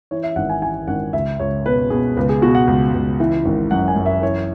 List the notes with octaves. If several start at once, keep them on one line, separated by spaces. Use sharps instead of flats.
E3 C#5
E5
G#1 F#5
G#5
E3 G#5
G#1 F#5
C#2 E5
C#2 C#5
B2 B4
B2 G#4
C#2 B4
G#4
B2 F#4
F#5
C#2
C#2
E3
G#1
F#2 F#5
G#5
F#2
E5
E3 C#5